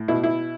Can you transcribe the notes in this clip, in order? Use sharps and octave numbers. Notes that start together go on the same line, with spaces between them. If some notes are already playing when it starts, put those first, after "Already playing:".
Already playing: A2
B2 E4
E4